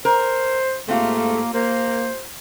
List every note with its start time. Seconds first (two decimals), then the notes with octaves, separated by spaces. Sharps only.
0.05 A#4 C5
0.88 G#2 A3 A#3 C4 F4 G4
1.54 A#3 C5